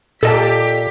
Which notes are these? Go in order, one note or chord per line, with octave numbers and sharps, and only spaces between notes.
A#2 G4 A4 D#5 A5 B6